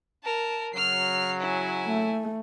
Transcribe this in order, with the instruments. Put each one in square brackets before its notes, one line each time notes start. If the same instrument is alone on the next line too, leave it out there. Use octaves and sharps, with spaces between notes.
[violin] A#4 A5
[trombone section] C#3 F#3 [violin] F6 C7
[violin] E4 G#5
[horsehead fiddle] A3